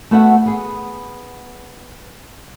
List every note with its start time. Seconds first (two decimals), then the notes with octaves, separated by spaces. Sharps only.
0.11 A3 B3 F#4 B4 E5 F#5
0.46 B3 G#4